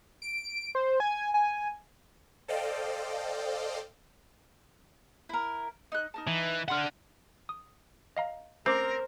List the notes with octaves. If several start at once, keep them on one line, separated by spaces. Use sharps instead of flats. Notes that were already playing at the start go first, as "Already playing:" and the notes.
D7
C5
G#5
G#5
A4 C5 D5 D#5 F5 G5
E4 A#4
D#4 F#6
D#4 A#4 A5
E3
D4 E5 F#5 C6 F6
D#6
D#5 F5 A#5
A3 C4 C#4 A#4 C5 D6